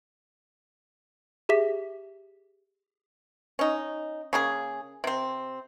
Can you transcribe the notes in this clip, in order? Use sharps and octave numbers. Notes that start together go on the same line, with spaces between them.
G4 G#4 E5 B6
C#4 D#4
C#3 A#3 G#4
C3 C4